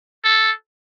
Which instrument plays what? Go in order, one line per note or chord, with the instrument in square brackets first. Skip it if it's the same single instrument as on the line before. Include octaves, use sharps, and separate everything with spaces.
[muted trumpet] A4